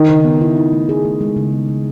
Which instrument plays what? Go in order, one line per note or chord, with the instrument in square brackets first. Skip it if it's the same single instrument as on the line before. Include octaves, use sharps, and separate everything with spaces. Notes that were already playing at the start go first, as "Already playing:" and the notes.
Already playing: [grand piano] D#3
[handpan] C#3
B3
E4
D#4
A3
G#4
A3
G#3
C#3
B3
C#3